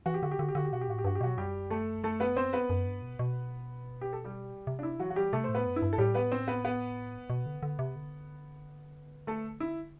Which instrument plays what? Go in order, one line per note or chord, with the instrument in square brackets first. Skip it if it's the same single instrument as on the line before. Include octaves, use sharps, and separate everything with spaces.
[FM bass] E3 [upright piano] F#4
[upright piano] G4
[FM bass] D3 [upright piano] F#4
[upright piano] G4
[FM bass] D3 [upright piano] F#4
[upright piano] G4
[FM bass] D3 [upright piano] F#4
[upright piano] G4
[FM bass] B2 [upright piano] F#4
[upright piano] G4
[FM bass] A2 [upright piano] F#4
[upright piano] G4
[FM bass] G2 [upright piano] F#4
[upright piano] G4
[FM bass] B2 [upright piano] F#3 F#4
[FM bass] F#2 [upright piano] G3 G4
[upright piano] A3 A4
A3 A4
B3 B4
C4 C5
B3 B4
[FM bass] F#2
G2
B2
B2
[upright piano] G4
A4
G3 G4
[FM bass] C3
[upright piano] D4
E4
[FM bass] E3 [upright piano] F#3 F#4
[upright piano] F#4
G3 G4
[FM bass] C3 [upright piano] A3 A4
[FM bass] A2 [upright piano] C5
[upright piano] B3 B4
[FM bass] F#2
[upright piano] E4
[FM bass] G2
[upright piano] A4
[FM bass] A2 [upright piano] G3 G4
[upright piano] B3 B4
C4 C5
B3 B4
B3 B4
[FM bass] B2
D3
D3
C3
D3
[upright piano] A3 A4
E4